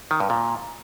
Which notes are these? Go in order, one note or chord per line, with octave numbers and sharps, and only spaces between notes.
D#3
G2
A#2